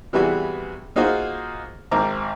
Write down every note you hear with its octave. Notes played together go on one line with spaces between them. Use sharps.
C3 E3 G3 B3 F#4 G#4
A#3 D#4 F4 F#4 G#4 C5
G#1 A#4 C5 A#5 D6